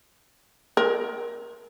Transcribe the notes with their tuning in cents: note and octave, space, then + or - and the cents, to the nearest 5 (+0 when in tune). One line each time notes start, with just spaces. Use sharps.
A#4 +20